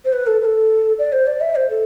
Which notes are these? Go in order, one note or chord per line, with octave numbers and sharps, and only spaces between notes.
C5
B4
A4
B4
A4
D5
C5
D5
E5
C5
A4